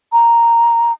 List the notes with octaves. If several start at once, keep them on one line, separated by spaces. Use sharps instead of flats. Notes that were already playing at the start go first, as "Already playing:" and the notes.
A#5